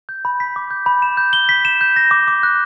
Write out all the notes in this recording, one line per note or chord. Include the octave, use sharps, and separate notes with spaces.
G6
B5
B6
D6
G6
B5
E7
G6
G7
B6
E7
G6
A#6
D6
D6
F#6